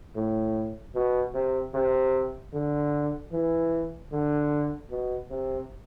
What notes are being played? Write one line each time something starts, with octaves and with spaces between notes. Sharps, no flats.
A2
B2
C3
C3
D3
E3
D3
B2
C3